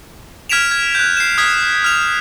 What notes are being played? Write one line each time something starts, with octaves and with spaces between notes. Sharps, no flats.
F6 G#6 B6 D7 E7 F7
G#6
F#6 G6
C7 E7
D#6 F6 G#6 B6
F6 F7